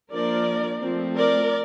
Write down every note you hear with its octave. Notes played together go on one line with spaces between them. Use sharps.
F3 A#3 D4 A#4 D5
F3 A3 C4
A#4 D5